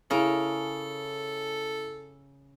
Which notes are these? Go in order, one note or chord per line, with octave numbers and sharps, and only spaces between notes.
C#3 C#4 E4 A4 A#4